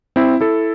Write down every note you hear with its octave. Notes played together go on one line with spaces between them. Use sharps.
C4 E4
E4 A4